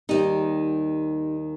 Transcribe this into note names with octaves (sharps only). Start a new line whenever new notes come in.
D#2 D#3 G3 D#4